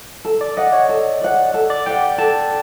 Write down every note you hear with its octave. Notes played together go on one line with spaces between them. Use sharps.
A4
D5
D5 D#5 F#5
C#5
A4
D5 F#5
A4
D5
D5 F#5 G5
A4 A5